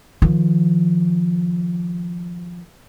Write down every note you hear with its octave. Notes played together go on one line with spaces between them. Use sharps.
D#3 F3